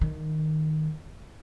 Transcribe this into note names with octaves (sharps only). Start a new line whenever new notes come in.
D#3